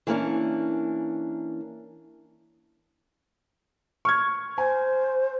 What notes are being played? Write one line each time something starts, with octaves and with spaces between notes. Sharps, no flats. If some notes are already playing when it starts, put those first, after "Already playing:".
E3 A#3 C#4 D4
C#6 F6 G#6
C5 G#5